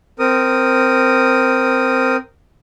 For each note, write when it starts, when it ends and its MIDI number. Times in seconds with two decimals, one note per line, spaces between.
0.19 2.16 60
0.19 2.16 70
0.19 2.16 87